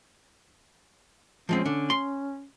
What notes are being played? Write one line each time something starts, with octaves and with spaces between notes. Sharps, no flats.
F3 G#3 C4 C#4
D3
C6